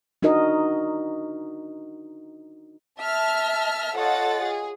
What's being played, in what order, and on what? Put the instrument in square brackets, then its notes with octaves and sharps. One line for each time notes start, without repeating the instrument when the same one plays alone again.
[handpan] D4 D#4 F#4 A#4 D#5
[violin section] E5 A5 F6
F4 A4 C#5 D#5 F#5 A6
G#4